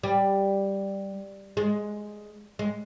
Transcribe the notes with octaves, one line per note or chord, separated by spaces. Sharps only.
G3
G#3
G#3